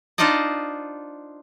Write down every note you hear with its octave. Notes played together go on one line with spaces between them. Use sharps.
D4 D#4 F4 C5 D5 D#5